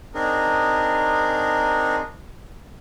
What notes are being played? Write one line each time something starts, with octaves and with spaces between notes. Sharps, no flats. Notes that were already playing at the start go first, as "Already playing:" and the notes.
C4 D4 D#4 G#4 A#4